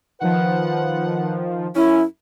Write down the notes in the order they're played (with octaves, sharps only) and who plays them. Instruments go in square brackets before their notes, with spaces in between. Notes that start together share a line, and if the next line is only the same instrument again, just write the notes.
[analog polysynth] D#3 F3 [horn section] B4 F#5
[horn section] F#2 C#4 [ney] E4